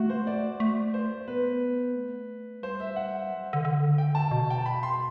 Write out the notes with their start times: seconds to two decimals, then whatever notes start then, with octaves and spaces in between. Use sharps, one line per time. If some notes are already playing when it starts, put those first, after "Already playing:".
Already playing: A3 F#4
0.10 C5
0.27 D5
0.60 A3
0.94 C5
1.28 B3 B4
1.95 A3
2.62 G3 C5
2.80 E5
2.96 F#5
3.30 F#3
3.53 D3
3.65 D3
3.98 G5
4.15 A5
4.31 B2
4.50 G5
4.58 A5
4.66 B5
4.83 C6